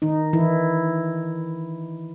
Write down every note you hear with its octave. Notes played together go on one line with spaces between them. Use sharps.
D#3 D#4
E3 E4